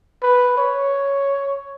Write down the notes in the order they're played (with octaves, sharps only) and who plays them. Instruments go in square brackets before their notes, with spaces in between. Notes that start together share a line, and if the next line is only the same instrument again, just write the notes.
[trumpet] B4
C#5